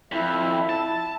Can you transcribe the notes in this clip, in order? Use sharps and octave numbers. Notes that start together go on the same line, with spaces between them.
F2 E4 E5
A5